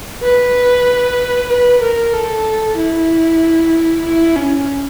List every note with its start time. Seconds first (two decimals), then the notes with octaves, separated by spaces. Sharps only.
0.23 B4
1.49 B4
1.82 A#4
2.13 A4
2.77 E4
4.04 E4
4.36 C#4